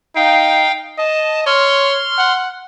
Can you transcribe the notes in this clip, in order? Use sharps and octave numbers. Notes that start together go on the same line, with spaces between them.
D#4 F5 G5
D#5 A5
C#5 C6 F6
F#5